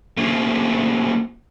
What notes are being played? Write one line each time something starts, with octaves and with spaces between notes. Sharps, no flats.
A3 A#3 C4 C#4 F4 G#4